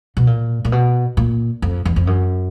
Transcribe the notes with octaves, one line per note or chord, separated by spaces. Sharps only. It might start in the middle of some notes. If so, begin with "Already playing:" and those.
B2
A#2
A#2
B2
A#2
F2
E2
F2
F#2